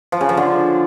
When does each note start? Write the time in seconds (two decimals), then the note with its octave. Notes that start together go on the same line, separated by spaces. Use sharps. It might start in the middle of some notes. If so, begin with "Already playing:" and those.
0.12 F3
0.21 C#3
0.29 F3
0.37 D3